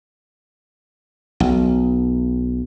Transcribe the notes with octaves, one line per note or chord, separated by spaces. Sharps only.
B1